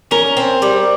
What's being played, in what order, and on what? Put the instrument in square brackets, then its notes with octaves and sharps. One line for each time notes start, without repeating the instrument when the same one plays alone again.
[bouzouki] C#4 [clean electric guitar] A#4
[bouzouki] C4
G3